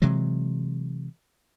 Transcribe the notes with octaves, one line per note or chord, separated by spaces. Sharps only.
C3 E3 F#3 G#3